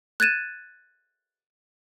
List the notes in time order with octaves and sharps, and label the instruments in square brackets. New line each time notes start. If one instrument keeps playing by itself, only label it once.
[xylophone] F#6 G#6 A6 D#7 E7